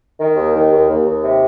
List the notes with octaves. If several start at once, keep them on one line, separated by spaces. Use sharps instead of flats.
D#3
D#2
D#3
D#2
D#2
D#2
C3